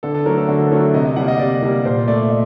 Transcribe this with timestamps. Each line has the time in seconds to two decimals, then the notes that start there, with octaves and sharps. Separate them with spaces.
0.03 D3 A4
0.14 A4
0.26 F#3 A3 A#4
0.38 A4
0.48 D3 F#4
0.66 A4
0.71 F#3 A3 A#4
0.94 C3 D#5
1.05 D#5
1.16 G3 A#3 F#5
1.28 D#5
1.39 C3 D5
1.63 G3 A#3
1.85 A#2 C5
2.08 A3 D5
2.30 D#5